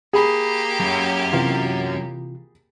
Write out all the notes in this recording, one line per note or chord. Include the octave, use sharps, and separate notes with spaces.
A#3 G4 G#4 B5
F#2
C3 E3 F4